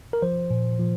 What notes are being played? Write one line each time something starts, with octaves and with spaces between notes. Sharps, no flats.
A#4
F3 C5
A#2
F3